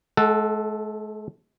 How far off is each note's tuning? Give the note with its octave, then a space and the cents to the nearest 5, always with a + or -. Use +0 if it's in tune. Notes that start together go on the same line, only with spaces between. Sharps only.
G#3 +45 A4 +0 F#5 +0